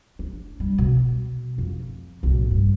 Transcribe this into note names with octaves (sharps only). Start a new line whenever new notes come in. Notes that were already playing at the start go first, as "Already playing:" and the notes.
D4
G3
B2
F2
B1 A2
G2